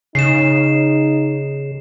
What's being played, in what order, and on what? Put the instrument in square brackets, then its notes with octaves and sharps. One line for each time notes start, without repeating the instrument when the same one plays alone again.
[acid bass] C#3 [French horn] D#4 [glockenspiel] C7 E7